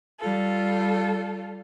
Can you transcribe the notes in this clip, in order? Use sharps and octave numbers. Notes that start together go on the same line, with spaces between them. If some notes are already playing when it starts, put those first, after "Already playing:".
G3 F4 A4